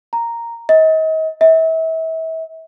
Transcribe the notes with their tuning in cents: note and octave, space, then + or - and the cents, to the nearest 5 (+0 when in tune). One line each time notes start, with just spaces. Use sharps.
A#5 -5
D#5 +35
E5 -35